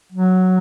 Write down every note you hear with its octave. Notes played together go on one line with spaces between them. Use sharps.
F#3